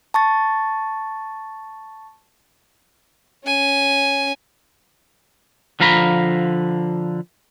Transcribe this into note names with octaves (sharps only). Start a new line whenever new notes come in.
A5 C#6 A6
C#4 G#5
D3 F3 F5 A#5 B5